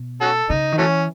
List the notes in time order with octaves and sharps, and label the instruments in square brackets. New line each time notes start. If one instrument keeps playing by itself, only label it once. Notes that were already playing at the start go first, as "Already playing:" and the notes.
Already playing: [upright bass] B2
[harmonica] C#4 F#4 A4
[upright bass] C#3 [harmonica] D#4
[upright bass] D#3
[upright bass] E3 [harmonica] F#3 A3 C#4